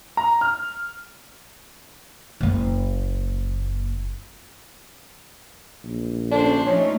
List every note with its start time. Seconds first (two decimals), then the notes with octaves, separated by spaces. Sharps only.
0.17 A#5
0.41 F6
2.40 F#1 A#3
5.84 A#1
6.31 D3 C#4 D4 C5
6.67 F3 A3 C#4 D#4